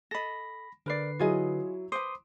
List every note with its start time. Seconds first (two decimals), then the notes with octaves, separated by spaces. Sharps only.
0.11 A4 D#5 B5 A#6
0.86 D3 A#4 B4 D5 C7
1.19 F#3 E4 F4 G#4 D#5
1.92 B4 C5 C6 D6 D#6